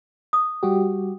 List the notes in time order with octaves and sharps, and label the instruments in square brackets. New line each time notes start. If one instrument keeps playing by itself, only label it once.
[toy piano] D#6
[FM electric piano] G3 F#4 G4